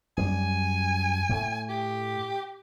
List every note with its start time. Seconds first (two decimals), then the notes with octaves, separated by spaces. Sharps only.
0.17 F#2 G3 G#5
1.29 A2 A3
1.69 G4